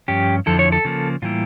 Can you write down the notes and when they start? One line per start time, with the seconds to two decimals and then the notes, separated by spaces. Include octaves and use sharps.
0.08 G2 F3 C#4 G4
0.46 F2 D3 F3 E4 A4
0.59 C#5
0.72 A4
0.85 C#3 F3 A#3
1.22 A2 E3 G3 A#3 E4 F4